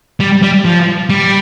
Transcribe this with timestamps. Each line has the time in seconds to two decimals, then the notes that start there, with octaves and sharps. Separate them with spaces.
0.20 G3
0.43 G3
0.65 F3
1.10 G3